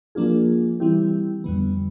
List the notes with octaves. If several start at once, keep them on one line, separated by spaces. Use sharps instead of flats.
F3 A#3 D4 F4 G#4
E3 G3 C4 E4 G4
F2 D3 G3 B3